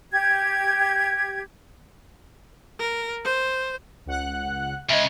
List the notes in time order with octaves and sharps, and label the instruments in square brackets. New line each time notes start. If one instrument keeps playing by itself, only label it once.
[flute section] G4 G#6
[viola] A#4
C5
[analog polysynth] C#2 F#5 F#6
[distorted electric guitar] C#3 G#3 [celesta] D#5 E5